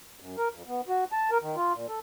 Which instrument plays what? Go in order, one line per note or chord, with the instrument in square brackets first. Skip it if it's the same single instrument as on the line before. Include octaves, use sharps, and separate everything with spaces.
[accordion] F#2
A#4
F2
B3
F#4
A5
A#4
D#3
F4
A#2
A4